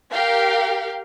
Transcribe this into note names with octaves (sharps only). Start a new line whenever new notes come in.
G4 A#4 F5 G5